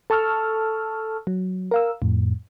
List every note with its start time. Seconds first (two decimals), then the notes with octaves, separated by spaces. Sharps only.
0.10 A4 A5 C#6 E6 F6
1.27 F#3
1.71 A#4 F5 E6
2.02 F2 A2